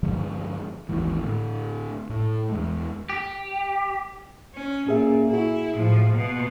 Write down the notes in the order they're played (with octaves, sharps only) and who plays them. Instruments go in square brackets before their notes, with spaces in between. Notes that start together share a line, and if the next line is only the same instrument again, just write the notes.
[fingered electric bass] G2 D3 F3 G#3
G#1 D#2 G#2 E3
A2 D3
A2
E2 G#3
[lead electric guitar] G4
[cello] C#4
[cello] A#2 [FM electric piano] C#4 G#4 E5
[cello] E4 [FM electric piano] F#4 G#4
[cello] A2 F3
B2